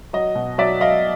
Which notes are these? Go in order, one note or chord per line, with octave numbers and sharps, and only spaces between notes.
F#3 D#5
B2
F#3 D5 E5
F#3 D#5 F5